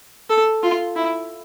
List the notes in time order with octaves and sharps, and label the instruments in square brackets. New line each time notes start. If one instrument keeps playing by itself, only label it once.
[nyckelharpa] A4
F4
E4